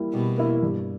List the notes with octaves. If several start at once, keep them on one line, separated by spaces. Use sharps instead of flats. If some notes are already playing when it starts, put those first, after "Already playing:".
Already playing: G3 A#3 E4
B2 G3
A#3 E4
G2